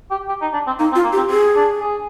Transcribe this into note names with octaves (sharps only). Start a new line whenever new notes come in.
G4
G4
D#4
D4
C4
A#3 D#4
C4
F4
A#3
G4
C4
C4 G#4
D4
G#4